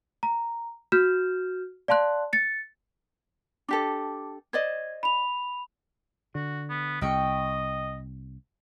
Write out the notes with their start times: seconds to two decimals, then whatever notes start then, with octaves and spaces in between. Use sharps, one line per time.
0.23 A#5
0.92 F#4 F6 G6 E7
1.88 D5 F5 A5 C6 F#6
2.33 A6 C#7
3.69 D4 G4 A4 D6
4.53 C5 D5 D#5 G#6
5.03 B5 F7
6.35 D3 F#4
6.70 B3
7.01 C2 D#5 G5 B5 C#6